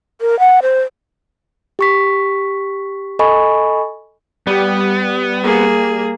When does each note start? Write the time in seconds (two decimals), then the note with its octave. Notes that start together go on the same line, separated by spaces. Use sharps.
0.21 A#4
0.40 F#5
0.62 C5
1.79 G4 C#6 B6
3.19 A4 D#5 G#5 B5 C#6
4.47 G3 B3 G4
5.43 A#3 G#4